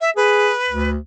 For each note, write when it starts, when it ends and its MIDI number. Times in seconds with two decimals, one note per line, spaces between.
0.01 0.10 76
0.16 0.52 68
0.16 0.90 71
0.69 0.97 38